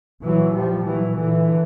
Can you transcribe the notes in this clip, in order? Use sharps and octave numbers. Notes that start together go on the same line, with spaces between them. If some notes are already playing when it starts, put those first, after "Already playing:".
A#2 E3 F#3
F3 G3
A#2 E3 F#3
D3 E3